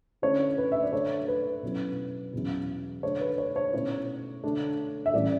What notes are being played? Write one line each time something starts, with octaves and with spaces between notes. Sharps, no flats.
D3 A3 C#4 E4 C#5
B4
E5
D5
D3 A3 D4 C#5
B4
B2 F#3 C#4 E4
E2 B2 F#3 C#4 E4
D3 A3 D4 C#5
B4
C#5
C#5
B2 A3 C#4 E4 C#5
D3 A3 D4
E5
A2 E3 G3 C#4 D5